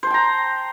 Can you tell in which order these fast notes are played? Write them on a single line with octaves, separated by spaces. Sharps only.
C5 A5 G5 A#5